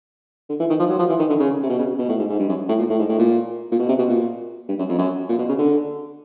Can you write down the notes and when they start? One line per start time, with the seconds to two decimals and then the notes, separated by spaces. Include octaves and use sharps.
0.49 D3
0.60 E3
0.69 D#3
0.79 F3
0.89 F#3
0.99 F3
1.09 E3
1.19 D#3
1.29 D3
1.39 C#3
1.63 C3
1.69 B2
1.79 C#3
1.99 B2
2.09 A2
2.19 G#2
2.29 G#2
2.39 G2
2.49 F#2
2.68 A2
2.79 A#2
2.89 A2
2.99 G#2
3.09 A2
3.19 A#2
3.71 A#2
3.79 B2
3.88 C3
3.98 B2
4.09 A#2
4.68 G2
4.79 F#2
4.89 F2
4.98 F#2
5.29 A#2
5.38 B2
5.48 C#3
5.58 D3